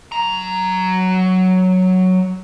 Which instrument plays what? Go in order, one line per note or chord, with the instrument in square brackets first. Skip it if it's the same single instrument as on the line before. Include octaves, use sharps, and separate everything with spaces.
[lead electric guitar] F#3 A#5